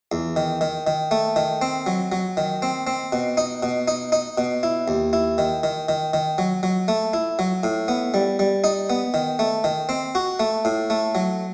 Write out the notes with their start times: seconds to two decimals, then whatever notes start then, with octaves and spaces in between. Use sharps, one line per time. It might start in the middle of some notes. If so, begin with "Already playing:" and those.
0.12 E2
0.36 D#3
0.61 D#3
0.87 D#3
1.11 A3
1.36 D#3
1.62 C4
1.86 F#3
2.12 F#3
2.37 D#3
2.62 C4
2.87 C4
3.12 B2
3.37 D#4
3.63 B2
3.88 D#4
4.12 D#4
4.38 B2
4.63 E4
4.88 D#2
5.13 E4
5.38 D#3
5.63 D#3
5.89 D#3
6.14 D#3
6.38 F#3
6.63 F#3
6.88 A3
7.13 E4
7.39 F#3
7.63 A2
7.88 B3
8.14 G3
8.39 G3
8.64 D#4
8.90 B3
9.14 D#3
9.39 A3
9.64 D#3
9.89 C4
10.15 F#4
10.40 A3
10.65 A2
10.90 A3
11.15 F#3